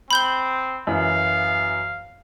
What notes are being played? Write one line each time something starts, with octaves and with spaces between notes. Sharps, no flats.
C4 B5 G6 G7
F#2 E3 F5